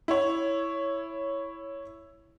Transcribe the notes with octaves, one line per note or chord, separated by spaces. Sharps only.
E4 C#5